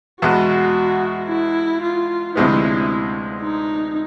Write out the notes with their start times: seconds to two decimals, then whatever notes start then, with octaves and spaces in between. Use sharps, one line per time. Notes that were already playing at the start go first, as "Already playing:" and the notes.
0.22 E2 B2 G#3 F#4
1.28 E4
1.82 F4
2.35 D2 C3 F3 G#3 B3 E4
3.42 D#4